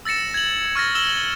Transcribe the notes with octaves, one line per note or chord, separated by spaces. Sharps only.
E6 A6 A#6 C#7 E7
G#6 F#7
C#6 F6 A6 A#6
E6 E7 F#7 G7